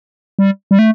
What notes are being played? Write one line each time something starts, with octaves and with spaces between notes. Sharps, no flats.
G3
G3
A3